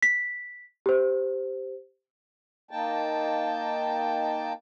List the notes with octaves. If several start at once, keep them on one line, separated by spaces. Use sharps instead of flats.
B6
G4 C5
A#3 D#4 G5 A5